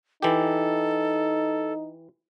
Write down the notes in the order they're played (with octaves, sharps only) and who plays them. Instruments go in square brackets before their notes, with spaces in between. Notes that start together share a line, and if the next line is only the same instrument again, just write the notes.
[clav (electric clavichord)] E3 G4 [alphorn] D#4 [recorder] A4